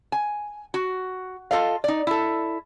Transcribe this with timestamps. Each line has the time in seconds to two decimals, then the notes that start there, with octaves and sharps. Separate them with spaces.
0.12 G#5
0.74 F#4
1.51 F4 A4 D#5 F5
1.84 D#4 D5
2.07 E4 A4